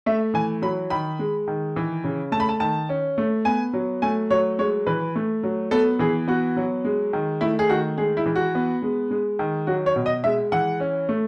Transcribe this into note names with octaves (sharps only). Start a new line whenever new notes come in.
A3 E5
E3 G#5
F#3 B5
D#3 B5
G#3
D#3
E3
C#3
A3 A5
B5
A5
D#3 A5
C#4
A3
B3 G#5
F#3
A3 G#5
F#3 C#5
G#3 C#5
E3 B4
A3
F#3
B3 A4
E3 G#4
B3 F#4
F#3
G#3
D#3
A3 E4
G#4
D#3 F#4
G#3 G#4
E4
E3
F#4
B3
G#3
G#3
D#3
F#3 F#4
C#5
B2
D#5
G#3 E5
E3 F#5
C#4
A3